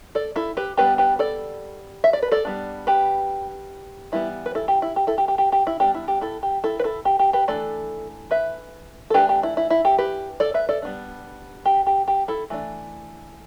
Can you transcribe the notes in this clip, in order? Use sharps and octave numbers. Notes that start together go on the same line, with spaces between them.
A4 D5
E4 A4
G4 B4
G3 B3 D4 G4 B4
G4 B4
A4 D5
E5
D5
B4
A4 D5
G3 B3 D4
G4 B4
E3 G3 B3 E4
B4
E4 A4
G4
E4
G4
E4 A4
G4
G4
G4
G4
E4
G3 B3 D4 G4
E4
G4
E4 A4
G4
E4 A4
B4
E4 A4
G4
G4
G4 B4
E3 A3 D4 A4 D5
B4 E5
A4
E3 A3 D4 G4 B4
G4
E4
E4
E4
G4
G4 B4
A4 D5
B4 E5
A4 D5
G3 B3 D4
G4
G4
G4
E4 A4
E3 A3 D4